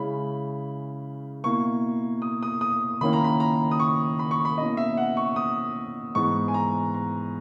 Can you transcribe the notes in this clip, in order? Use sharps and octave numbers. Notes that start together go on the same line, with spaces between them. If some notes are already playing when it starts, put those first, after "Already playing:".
Already playing: C#3 G#3 C#4 E4 B5
B2 A#3 E4 C#6
D#6
D#6
D#6
D#3 A#3 C#4 E4 B5
A#5
B5
A#5
D#6
C#6
B5
C#6
B5
B2 A#3 C#4 E4 D#5
E5
F#5
C#6
D#6
G#2 E3 B3 C#6
G#5
A#5
A#5